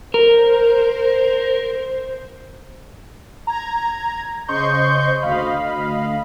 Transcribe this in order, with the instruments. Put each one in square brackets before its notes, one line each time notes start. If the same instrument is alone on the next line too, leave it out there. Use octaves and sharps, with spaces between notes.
[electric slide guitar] A#4 [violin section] C5
[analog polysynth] A#5 G#6
C#3 C5 D#5 C6 C#6 G6
D2 D#5 F5 B5